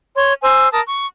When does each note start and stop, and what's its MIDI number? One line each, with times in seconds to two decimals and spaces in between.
0.16 0.34 73
0.16 0.34 84
0.42 0.68 72
0.42 0.68 80
0.42 0.68 88
0.72 0.80 70
0.72 0.80 81
0.72 0.80 87
0.85 1.05 85